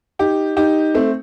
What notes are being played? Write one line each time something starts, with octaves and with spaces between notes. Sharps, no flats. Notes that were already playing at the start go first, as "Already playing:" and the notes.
D#4 G4
D#4 G4
A3 C4